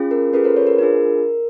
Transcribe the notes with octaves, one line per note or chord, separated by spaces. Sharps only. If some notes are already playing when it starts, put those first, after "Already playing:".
Already playing: C#4 F4 G#4
A#4
C#4 F4 G#4 A4 B4
A#4 C5
B4 C#5
A#4 C5
D4 F4 G#4 A#4